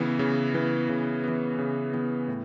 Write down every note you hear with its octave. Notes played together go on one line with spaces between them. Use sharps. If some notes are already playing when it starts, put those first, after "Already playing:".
Already playing: C#3 E3 B3
C#3
E3 B3
C#3
E3 B3
C#3
E3 B3
A2